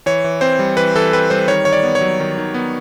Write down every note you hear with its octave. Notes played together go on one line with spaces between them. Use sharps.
E3 C#5
E3
C4 C5
G3
E3 B4
E3 A4
C4 B4
G3 C5
D#3 C#5
D#3 C#5
D5
B3
C#5
F#3
D#3
D#3
B3